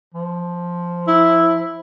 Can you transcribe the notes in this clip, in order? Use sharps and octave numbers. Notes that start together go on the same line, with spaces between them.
F3
E4